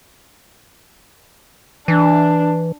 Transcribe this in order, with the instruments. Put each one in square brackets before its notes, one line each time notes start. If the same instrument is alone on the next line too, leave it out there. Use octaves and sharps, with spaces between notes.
[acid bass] E3 [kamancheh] D4